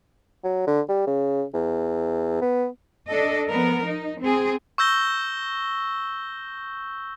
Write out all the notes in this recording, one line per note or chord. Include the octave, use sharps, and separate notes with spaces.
F#3
D3
G3
C#3
E2
B3
D4 A4 D#5
F3 B3 A#4
D#4
C4 G#4
C#6 E6 G6 A#6 G7